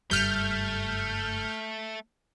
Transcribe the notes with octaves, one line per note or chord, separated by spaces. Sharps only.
F#1 G2 G3 A3 F6 G6